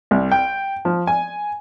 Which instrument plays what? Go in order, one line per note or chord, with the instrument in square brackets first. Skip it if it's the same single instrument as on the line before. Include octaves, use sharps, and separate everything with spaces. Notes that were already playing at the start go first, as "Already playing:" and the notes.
[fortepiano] C2
G5
F3
G#5